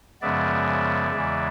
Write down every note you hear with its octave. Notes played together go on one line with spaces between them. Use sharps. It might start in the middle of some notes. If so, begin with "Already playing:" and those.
F#2 C#3 F3 G#3 B3 D5 E5
E2 C#3 E3 G#3